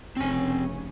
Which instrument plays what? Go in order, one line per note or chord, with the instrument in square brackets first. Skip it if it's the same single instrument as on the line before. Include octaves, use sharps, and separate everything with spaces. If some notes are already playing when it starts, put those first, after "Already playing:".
[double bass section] F1 C#3 C#4 [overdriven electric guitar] C4 G#5